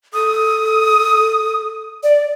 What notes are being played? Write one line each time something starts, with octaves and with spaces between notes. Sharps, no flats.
A4 D#6
D5